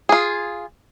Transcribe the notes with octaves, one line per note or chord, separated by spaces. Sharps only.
F4 G#4